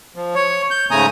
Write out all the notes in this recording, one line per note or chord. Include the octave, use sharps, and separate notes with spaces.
F3
C#5
G6
G#2 C#3 A3 G#5 A#5 D#6